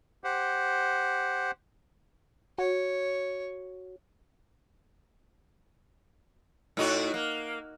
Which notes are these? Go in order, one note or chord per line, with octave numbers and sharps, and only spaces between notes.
G4 C5 F#5
F#4 C#5
A2 D#4 F#4
A#3